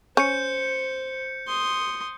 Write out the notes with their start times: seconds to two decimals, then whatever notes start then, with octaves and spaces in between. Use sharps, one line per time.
0.17 C#4 C5 G6 C#7
1.48 C6 D#6